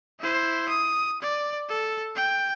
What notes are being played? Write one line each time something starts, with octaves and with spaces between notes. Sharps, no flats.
E4 C5
D#6
D5
A4
G5